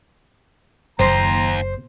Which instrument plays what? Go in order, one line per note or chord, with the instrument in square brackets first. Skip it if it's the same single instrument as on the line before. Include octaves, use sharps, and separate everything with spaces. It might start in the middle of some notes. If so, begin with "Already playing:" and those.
[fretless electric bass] F#1 [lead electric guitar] D#2 [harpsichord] C5 C6 [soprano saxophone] A#5